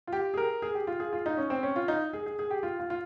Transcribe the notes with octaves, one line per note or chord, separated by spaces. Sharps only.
F4
G4
G#4
A#4
G#4
G4
F4
G#4
F4
D#4
C#4
C4
C#4
F4
D#4
G#4
G#4
G#4
G4
F4
F4
F4